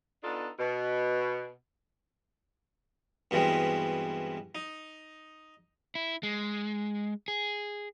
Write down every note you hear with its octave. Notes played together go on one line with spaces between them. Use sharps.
B3 D4 D#4 F4 A4
B2
G2 B2 E3 G#3 C4
D#4
E4
G#3
G#4